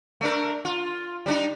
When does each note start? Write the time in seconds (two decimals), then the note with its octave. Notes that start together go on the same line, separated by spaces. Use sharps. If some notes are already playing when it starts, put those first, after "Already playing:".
0.21 A3 D4 A#4
0.65 F4
1.26 G3 D4 D#4